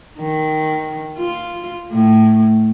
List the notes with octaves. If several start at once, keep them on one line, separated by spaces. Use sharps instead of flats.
D#3
F4
A2